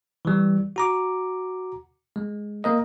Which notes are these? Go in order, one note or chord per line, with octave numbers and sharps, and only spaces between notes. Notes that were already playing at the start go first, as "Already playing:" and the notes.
E3 G3
F#4 A#5 D6
G#3
A#3 A#4 D#5